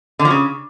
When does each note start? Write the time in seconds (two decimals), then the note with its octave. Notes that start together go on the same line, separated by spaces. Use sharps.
0.19 D3
0.25 F3
0.30 C#3